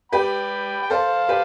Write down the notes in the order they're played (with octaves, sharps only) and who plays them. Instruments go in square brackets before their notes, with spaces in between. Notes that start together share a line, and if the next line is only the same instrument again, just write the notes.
[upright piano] G4 B4 [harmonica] G5 B5
[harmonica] G5
[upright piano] A4 C5 [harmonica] F5 A5
[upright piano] G4 B4